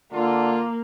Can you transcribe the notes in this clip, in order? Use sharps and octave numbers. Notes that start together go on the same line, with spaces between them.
D3 A#3 F4